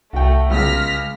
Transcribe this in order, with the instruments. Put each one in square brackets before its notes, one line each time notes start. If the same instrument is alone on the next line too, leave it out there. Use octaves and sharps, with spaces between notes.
[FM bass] C2 [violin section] A3 [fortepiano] F#4 G5
[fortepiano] C#2 C#3 E6 [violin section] F6 A#6 B6